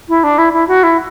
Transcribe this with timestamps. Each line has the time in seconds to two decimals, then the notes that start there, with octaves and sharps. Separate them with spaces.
0.09 E4
0.24 D4
0.38 E4
0.53 E4
0.68 F#4
0.83 E4